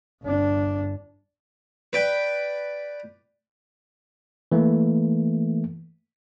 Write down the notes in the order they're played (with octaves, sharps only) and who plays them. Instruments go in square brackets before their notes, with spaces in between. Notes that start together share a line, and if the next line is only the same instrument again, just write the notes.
[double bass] G1 D4
[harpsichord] B4 D5 G5
[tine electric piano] E3 A3 A#3